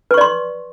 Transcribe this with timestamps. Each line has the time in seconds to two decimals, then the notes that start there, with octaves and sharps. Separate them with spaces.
0.11 B4
0.14 C#6
0.18 D5
0.21 C6